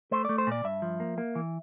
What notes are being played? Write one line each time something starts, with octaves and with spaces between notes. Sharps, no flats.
A3 C5
A3 D5
C5
A#2 D5
G2 E5
F3
A#3
A#3
E3